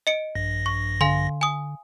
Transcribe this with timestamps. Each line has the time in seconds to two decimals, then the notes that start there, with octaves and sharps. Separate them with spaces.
0.07 D#5 C#7 D7
0.35 A#1 G2 A#6
0.66 C#6
1.01 D3 F5 G#5 C6
1.41 G#5 D#6